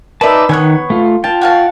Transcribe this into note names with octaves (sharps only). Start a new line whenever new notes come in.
D#4 B4 D5 E5 A5
D#3 B3 C#4 C#5 F#6
A3 F4
F4 G5 A5
F#4 F5 A5